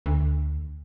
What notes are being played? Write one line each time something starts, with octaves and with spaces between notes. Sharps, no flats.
D2